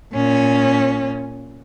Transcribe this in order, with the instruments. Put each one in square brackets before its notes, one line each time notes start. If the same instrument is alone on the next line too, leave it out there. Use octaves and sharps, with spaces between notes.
[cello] A#2 C#4